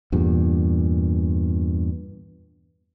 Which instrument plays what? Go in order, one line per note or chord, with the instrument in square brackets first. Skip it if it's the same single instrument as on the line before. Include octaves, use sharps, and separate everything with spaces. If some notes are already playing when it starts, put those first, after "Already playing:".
[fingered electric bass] E2 G2 A#2